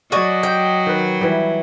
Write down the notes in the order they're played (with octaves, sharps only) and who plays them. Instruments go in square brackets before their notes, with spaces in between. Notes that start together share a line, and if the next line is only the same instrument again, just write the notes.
[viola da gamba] F#3 [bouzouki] F#4 D5 G#5 [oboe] D#5
[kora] G4 [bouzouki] G5
[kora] D#3 B4
E3 G3